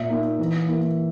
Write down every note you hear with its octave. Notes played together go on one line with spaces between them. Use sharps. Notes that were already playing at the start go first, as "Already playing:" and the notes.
Already playing: A#2 E5
A#3 D#4
E3
A#3 E4